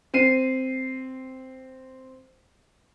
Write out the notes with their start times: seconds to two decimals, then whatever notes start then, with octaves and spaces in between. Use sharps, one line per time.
0.14 C4 C7 D#7